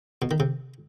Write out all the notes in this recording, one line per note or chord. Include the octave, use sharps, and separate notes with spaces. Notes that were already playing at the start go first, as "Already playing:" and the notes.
B2
D#3
C3